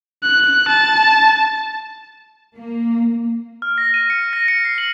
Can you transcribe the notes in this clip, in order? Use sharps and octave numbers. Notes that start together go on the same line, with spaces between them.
F#6
A5
A#3
F6
A#6
D#7
C#7
A#6
C#7
C7
F#7